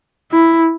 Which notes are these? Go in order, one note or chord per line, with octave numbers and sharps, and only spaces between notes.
E4